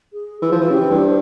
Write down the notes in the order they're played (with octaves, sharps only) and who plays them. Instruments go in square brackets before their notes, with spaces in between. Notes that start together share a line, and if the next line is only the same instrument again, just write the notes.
[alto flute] G#4
[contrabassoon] E3 [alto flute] G#4
[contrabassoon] F3 [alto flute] F4
[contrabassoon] E3 [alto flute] F4
[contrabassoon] C#3 [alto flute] G4
[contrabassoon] E3
G2
[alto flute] C5